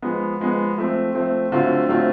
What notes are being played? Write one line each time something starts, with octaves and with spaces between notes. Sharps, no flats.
F3 G#3 B3
F3 G#3 B3
F3 A3 C4
F3 A3 C4
D3 F#3 A3 C4 F4
D3 F#3 A3 C4 F4